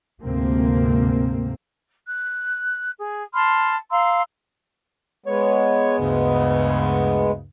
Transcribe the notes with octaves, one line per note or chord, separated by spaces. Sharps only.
D2 G#2 C3 A#3 C4
F#6
G#4
A5 B5 C6 F6
F5 A#5 C6 E6
G#3 B3 C#5
D2 G2 C#3